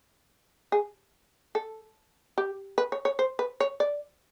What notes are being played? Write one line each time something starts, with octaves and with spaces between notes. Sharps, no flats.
G#4
A4
G4
B4
C#5
C#5
C5
B4
C#5
D5